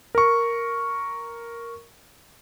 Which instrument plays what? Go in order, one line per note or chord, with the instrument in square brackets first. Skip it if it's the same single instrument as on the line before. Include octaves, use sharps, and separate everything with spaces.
[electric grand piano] A#4 C#6